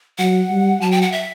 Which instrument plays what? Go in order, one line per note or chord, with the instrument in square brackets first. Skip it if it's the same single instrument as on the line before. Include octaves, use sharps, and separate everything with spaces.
[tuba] F#3 [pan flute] F#5
[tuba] G3
[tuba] F#3 [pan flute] A5
[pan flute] G5
F#5
E5